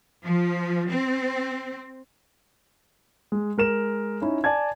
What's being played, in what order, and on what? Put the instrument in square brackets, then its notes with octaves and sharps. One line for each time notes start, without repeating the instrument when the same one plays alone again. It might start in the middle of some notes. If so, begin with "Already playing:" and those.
[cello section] F3
C4
[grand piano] G#3
G#3 A#4 E7
C#4 D#4 E4
D5 G#5 A5 G#6